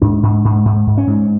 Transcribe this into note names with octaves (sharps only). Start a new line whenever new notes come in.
G#2 D4
G#2
G#2
G#2
G#2
C#4
G#2